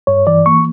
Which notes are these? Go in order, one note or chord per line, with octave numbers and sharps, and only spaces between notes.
G2 C#5
E3 D5
A#3 C#6